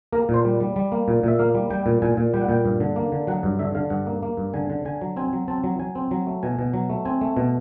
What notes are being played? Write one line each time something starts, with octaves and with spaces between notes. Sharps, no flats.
A#3 A#4
A#2
C5
G3
G3
G3
A#3
A#2
A#2 E5
A#3 F5
G3
G3 G5
A#2
A#2 G#5
A#2
G3 G5
F#5
A#2 G5
G2
D3
A#3
D3
F#3 F#5
G2
D3 E5
D3 F5
G2 F#5
A#3
A#3
G2
D3 G#5
D3
D3 G#5
F#3
C4 G#5
F#3
C4 A5
F#3
F#3 G#5
C4
F#3
A3
B2 G#5
B2
F#3
A3
C4 G#5
A3
B2